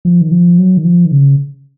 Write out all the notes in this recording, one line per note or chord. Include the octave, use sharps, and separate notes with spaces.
F3
D#3
F3
F#3
D#3
F3
D#3
C#3